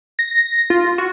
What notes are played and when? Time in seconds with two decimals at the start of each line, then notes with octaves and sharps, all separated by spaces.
0.19 A#6
0.70 F4
0.98 F#4